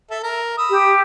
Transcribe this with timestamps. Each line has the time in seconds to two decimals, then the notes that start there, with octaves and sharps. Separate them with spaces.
0.11 A4 E5
0.23 A#4
0.58 B5 D#6 E6
0.70 G4